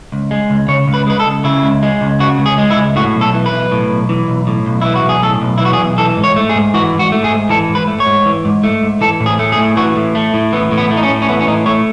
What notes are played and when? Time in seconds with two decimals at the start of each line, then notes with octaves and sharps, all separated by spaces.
0.12 C#2
0.31 G#3
0.50 C#2
0.68 C#3 C#5
0.88 C#2
0.94 B4
1.07 G#3 B4
1.20 A4
1.25 C#2
1.44 C#3 E4
1.63 C#2
1.83 G#3
2.01 C#2
2.20 C#3 F#4
2.39 C#2
2.46 G#4
2.58 G#3
2.70 E4
2.77 C#2
2.96 A2 F#4
3.15 B1
3.21 A4
3.34 E3
3.46 B4
3.52 B1
3.71 A2
3.90 B1
4.09 E3
4.28 B1
4.47 A2
4.66 B1
4.82 E3 E4
4.95 F#4
5.04 B1
5.09 G#4
5.23 A2 A4
5.42 B1
5.58 E4
5.61 E3 F#4
5.73 G#4
5.79 B1
5.98 E3 A4
6.17 G#2
6.24 C#5
6.36 A3
6.49 G#4
6.55 G#2
6.74 E3 F#4
6.93 G#2
6.99 F#4
7.12 A3
7.24 G#4
7.31 G#2
7.49 E3 A4
7.69 G#2
7.75 B4
7.87 A3
8.00 C#5
8.06 G#2
8.26 E3
8.45 G#2
8.63 A3
8.83 G#2
9.01 E3 A4
9.20 A2
9.26 G#4
9.39 A3
9.52 G#4
9.58 A2
9.77 E3 F#4
9.96 A2
10.15 A3
10.34 A2
10.53 E3 B3
10.71 A2
10.78 B3
10.91 A3
10.97 D#4
11.03 C#4
11.10 A2
11.22 C#4
11.28 E3 B3
11.41 C#4
11.47 A2 D#4
11.66 A3 C#5